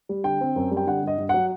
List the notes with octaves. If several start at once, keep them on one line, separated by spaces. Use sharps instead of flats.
G3
D3 G5
C4
F#2
G3
G5
D3 F#5
G2 D#5
G2
F#3 F#5